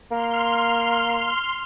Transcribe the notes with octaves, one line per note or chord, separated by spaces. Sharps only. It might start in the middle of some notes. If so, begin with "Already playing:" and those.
A#3 C6 F6